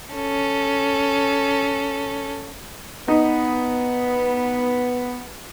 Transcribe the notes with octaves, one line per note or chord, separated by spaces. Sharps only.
C#4 A4
B3 D#4